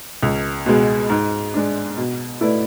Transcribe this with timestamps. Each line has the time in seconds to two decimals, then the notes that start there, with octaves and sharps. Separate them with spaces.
0.23 C#2
0.66 B2 G#3
1.10 G#2
1.54 G#3 D4
1.97 B2
2.41 A3 E4 B4 D5